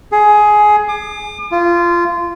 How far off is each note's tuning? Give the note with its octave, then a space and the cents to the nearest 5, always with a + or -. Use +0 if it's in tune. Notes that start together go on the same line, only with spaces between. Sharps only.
G#4 +15
D6 +45
F4 -20